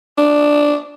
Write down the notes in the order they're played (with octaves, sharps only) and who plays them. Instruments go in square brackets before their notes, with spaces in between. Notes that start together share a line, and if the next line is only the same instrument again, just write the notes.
[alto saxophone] D4